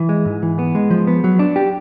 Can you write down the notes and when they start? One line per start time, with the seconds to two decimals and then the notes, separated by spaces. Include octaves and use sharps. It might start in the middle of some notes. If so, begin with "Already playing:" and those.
Already playing: E3
0.09 G#3
0.25 G#2
0.43 E3
0.59 B3
0.75 G#3
0.90 F3
1.07 B3
1.24 F#3
1.39 D4
1.56 G4